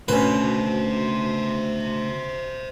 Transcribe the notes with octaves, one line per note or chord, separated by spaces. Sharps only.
D2 B2 C#4 B4 C5 E5